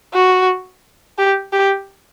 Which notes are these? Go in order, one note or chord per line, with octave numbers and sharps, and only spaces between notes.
F#4
G4
G4